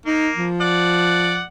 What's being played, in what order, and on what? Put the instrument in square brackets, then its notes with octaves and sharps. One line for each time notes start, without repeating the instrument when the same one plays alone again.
[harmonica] A#3 [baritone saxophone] D#4
[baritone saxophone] F3
[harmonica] D5 F#5